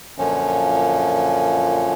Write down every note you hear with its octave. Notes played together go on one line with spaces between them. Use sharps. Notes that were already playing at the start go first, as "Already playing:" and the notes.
F#2 A#2 D3 F3 C#4